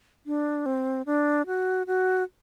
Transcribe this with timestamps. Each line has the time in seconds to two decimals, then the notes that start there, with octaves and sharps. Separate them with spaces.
0.26 D4
0.66 C4
1.06 D4
1.47 F#4
1.87 F#4